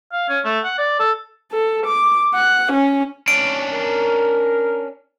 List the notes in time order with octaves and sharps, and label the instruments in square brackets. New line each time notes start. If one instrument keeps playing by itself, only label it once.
[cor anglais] F5
C#4
A3
F#5
D5
A4
[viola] A4
D6
F#5
C#4
[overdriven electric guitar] C#4 D4 [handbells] D7
[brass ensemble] A#4